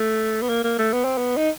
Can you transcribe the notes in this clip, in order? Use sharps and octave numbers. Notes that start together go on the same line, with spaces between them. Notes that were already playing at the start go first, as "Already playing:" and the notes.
Already playing: A3
B3
A#3
A#3
A3
B3
C4
B3
D#4